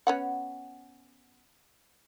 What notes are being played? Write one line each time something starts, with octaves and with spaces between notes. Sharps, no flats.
B3 C#4 F#5